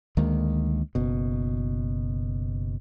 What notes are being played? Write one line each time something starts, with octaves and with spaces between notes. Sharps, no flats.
D2 D#3 G#3 A#3
F#1 B2